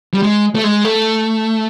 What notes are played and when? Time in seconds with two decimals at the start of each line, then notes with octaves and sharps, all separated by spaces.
0.14 G3
0.23 G#3
0.55 A3
0.64 G#3
0.85 A3